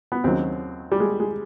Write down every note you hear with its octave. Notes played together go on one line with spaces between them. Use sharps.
B3
D#2 C#3 F#3 C4
G3
G#3
G#3